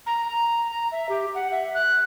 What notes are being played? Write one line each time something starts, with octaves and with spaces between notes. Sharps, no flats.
A#5
A#5
A#5
E5
G4
F#5
E5
F#6